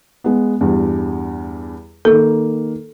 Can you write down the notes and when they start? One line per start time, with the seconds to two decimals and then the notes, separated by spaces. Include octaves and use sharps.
0.24 G#3 B3
0.61 E2 G2
2.05 D#3 A#3 A4